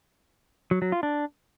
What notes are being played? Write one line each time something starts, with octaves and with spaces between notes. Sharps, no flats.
F#3
F#3
F4
D4